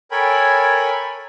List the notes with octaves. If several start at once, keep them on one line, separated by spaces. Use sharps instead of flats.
A4 A#4 C#5 G5 G#5 B5